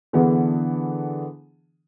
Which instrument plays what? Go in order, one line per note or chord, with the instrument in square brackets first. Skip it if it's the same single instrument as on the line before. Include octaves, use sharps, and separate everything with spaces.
[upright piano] D3 E3 B3 D4 G#4